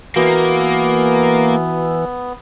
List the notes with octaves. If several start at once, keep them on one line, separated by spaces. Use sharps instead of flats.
E3 A#3 B3 F#4